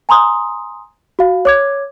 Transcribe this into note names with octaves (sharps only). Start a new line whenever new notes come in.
G#5 A#5 C6 D#6
F#4 F5
C#5 D6 G#6